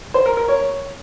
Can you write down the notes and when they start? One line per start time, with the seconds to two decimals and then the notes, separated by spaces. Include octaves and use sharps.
0.14 C5
0.26 A#4
0.37 A#4
0.48 C#5